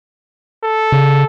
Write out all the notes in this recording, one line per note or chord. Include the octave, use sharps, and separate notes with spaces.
A4
C#3